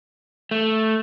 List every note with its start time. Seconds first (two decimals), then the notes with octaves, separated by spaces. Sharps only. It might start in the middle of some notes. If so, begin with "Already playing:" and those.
0.51 A3